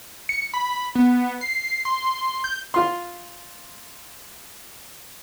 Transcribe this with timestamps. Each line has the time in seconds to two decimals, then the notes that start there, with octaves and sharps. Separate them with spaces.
0.29 C#7
0.54 B5
0.95 B3
1.41 C7
1.85 C6
2.44 G6
2.74 F4 C6